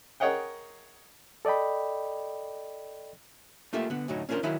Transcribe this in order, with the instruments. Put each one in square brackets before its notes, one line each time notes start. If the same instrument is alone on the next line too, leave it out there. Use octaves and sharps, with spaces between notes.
[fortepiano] G#4 A#4 C#5 D#5 F#5 G5
[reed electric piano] A4 D5 D#5 G5 B5
[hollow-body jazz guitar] A3 A#3 F4 G4 A4 E5
D3 B3
D2 A2 F#3 D#4
C#4 D4 F4 G#4 A#4 C5
D#3 F#3 E4 A#4 F5 B5